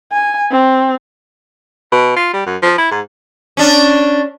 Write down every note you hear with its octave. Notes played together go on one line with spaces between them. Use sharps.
G#5
C4
B2
F4
G3
F#2
F3
E4
G#2
C#4 D4